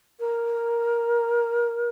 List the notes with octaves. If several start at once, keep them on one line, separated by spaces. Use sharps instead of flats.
A#4